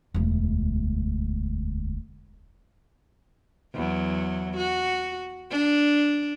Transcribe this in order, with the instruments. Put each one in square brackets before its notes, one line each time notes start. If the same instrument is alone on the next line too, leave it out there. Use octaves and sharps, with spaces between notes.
[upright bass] E1 D2
[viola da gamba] E2 F#3
F#4
D4